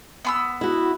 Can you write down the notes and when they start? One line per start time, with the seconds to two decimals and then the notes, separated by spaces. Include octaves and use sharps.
0.25 B3 C6 E6
0.61 E4 F#4